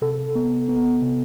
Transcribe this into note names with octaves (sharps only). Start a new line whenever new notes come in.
C3 A4
B3
B3
C3